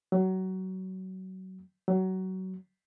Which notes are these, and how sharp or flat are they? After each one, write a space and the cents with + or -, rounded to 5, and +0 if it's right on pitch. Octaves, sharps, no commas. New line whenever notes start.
F#3 +20
F#3 +20